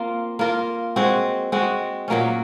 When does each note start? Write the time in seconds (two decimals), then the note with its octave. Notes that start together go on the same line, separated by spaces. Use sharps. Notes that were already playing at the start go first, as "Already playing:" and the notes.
Already playing: A#3 C4 F4 A#4
0.39 A#3 F4 A#4
0.96 G#3 C4 F#4
1.52 G#3 C4 F#4
2.08 A#2 F#3 A#3 C#4